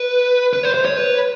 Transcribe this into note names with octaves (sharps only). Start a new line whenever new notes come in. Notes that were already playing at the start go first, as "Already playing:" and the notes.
Already playing: B4
B4
C5
C5
C#5
B4